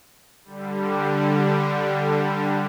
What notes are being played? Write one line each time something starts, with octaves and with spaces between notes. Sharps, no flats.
D3 G3